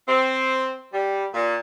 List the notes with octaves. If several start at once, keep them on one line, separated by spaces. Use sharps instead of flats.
C4
G3
A#2